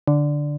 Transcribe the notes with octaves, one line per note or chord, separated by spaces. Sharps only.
D3